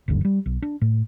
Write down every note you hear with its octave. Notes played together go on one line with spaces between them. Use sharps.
F#1 D2 G2 D3
E3 G3
B1
D4
A2